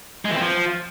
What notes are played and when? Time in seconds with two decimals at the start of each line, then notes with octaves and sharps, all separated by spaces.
0.25 G#3
0.30 E3
0.36 C4
0.41 F3